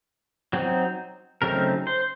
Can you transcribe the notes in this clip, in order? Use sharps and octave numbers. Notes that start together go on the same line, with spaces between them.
F#3 C4 D#4
C#3 F#3 A3 C4 D#4 A#4
C5